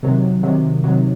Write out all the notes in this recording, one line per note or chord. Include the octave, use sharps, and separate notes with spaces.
C3 D#3 F#3
C3 D#3 F#3
C3 D#3 F#3